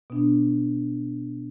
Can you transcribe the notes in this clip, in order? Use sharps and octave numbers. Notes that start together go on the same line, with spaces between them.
B2 B3 D4